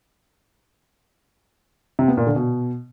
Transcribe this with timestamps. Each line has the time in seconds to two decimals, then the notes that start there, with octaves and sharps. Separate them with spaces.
1.99 C3
2.08 B3
2.17 A#2
2.27 D3
2.36 B2